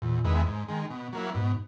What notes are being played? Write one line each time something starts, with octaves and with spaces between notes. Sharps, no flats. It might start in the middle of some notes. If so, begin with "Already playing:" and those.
E2 A#2
E2 D#3 G#3 B3 E4
G#2
D#3 G#3
B2
F#3 A#3 E4
G#2 B2